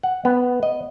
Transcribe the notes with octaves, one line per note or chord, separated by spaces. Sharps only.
F#5
B3
D#5